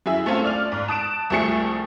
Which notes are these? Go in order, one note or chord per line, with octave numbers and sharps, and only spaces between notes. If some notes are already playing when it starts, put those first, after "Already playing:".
F#2 E4 G#4 E5
A3 C4 C#4 F4 A4
D5 F6 F7
G#2
A5 D#6 F#6 D7 E7
C2 F3 A3 G#4 C#7